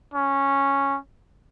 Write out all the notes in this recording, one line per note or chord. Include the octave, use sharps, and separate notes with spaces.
C#4